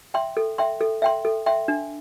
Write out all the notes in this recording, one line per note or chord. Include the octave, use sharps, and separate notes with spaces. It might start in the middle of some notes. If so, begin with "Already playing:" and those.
E5 G5 C6
A4
E5 G5 C6
A4
E5 G5 C6
A4
E5 G5 C6
D4